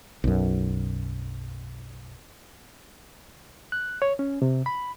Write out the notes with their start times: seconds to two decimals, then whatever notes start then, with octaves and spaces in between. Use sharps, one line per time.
0.24 B1 F#2
3.72 F#6
4.02 C#5
4.19 C#4
4.42 C3
4.66 B5